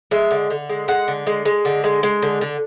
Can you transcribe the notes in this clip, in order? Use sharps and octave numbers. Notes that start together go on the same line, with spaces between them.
G#3 E5
D3
D3
G#3
G#3 F#5
D3
G#3
G#3
D3
G#3
G#3
D3
D3